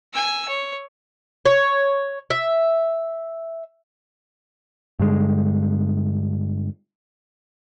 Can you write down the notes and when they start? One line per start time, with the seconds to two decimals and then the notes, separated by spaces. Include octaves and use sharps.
0.13 G#5 E6
0.48 C#5
1.46 C#5
2.30 E5
4.99 G2 D3 G#3